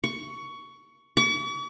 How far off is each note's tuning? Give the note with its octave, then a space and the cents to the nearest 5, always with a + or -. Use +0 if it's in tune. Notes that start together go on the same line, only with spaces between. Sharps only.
C#6 +15
C#6 +45